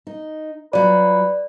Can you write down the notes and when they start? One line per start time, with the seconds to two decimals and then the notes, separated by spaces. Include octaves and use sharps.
0.07 D#4
0.73 F#3 F4 B4 D5